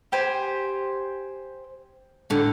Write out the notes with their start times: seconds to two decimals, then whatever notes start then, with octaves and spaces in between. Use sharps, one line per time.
0.12 G4 C5 G#5
2.30 A2 D3